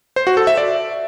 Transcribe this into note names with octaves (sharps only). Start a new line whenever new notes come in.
C5
F#4
A4
E5
D5